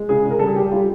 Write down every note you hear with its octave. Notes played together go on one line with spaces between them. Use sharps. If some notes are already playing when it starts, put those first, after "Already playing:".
Already playing: G#3
C#3 G#4
C#3
A#4
G3 A4
G#4
G3 G4
G3 F4